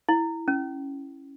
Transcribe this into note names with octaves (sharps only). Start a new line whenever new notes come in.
E4
C#4